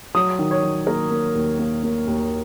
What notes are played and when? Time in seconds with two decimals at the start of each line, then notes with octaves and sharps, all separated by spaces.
0.15 F#3 D#6
0.39 D#3
0.51 C#5
0.63 F#3
0.87 A#3 A#4
1.11 A#3
1.35 D#2
1.59 A#3
1.83 A#3
2.07 D#2